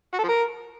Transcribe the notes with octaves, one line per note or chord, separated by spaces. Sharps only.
F#4
A4
F3
A#4